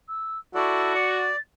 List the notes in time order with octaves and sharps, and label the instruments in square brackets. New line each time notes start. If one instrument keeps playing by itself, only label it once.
[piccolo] E6
[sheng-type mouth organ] E4 A4 D5 [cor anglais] F#4 [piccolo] C#6
[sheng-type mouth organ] D5 [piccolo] C#7
[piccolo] A6